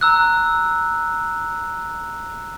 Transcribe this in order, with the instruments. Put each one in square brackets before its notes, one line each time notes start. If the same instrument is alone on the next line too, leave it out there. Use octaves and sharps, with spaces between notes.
[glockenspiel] A#5 E6 F#6